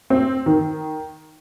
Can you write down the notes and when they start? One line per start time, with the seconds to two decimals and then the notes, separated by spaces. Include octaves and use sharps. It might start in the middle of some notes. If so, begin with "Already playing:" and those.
0.10 C4
0.46 D#3